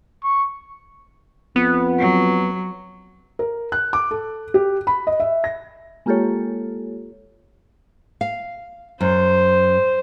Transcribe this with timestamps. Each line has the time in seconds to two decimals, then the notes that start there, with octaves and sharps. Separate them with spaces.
0.24 C#6
1.56 F2 B3
2.00 F#3
3.39 A#4
3.72 F#6
3.93 D6
4.11 A4
4.54 G4
4.87 B5
5.07 D#5
5.20 E5
5.44 A#6
6.06 G#3 A#3 F4 G4 A4 C#5
8.21 F5
9.01 F#2 C5